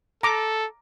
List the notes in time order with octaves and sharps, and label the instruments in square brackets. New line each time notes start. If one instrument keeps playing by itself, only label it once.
[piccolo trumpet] A4 [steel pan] A#5 D6